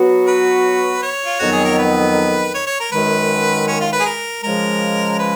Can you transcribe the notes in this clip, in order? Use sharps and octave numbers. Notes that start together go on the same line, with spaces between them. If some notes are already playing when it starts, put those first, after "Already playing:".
Already playing: F#3 B3 F#4
B4
C#5
F4
F2 D#3 F#3 B3 F#4
G#4
A#4
B4
C#5
C#5
A#4
F#2 D#3 G#3 B4
C#4
F4
B4
G#4
A#4
C#3 F3 G#3 A#4
B4